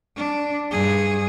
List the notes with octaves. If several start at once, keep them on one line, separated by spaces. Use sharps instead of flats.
D4
G2 G#4